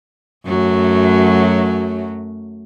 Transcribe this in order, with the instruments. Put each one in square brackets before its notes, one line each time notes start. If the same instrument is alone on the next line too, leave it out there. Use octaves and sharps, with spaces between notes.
[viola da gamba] F#2 F#3 A3